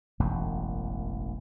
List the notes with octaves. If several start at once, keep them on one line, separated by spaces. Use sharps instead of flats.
E1 A1 F#2